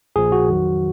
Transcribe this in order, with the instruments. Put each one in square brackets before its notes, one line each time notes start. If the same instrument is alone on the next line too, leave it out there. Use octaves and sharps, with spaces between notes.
[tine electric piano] A#1 A#2 F3 G#4
F#4
F2 D#3 F#3